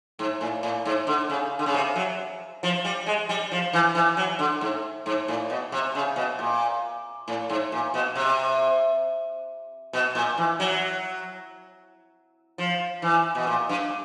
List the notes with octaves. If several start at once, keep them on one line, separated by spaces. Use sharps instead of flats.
G#2
A2
A2
G#2
D3
C#3
D3
C#3
C3
F#3
F3
G3
G#3
G3
F3
E3
E3
F#3
D3
G#2
G#2
A2
B2
C3
C#3
B2
A#2
A2
G#2
A#2
B2
C3
B2
A#2
E3
F#3
F3
E3
B2
A#2
G2